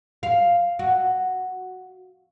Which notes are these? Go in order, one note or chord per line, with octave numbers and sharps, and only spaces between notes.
F5
F#4